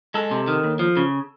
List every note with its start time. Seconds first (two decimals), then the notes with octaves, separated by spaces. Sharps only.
0.14 G#3 A4
0.31 C3
0.48 D#3
0.63 D#2
0.79 F3
0.97 C#3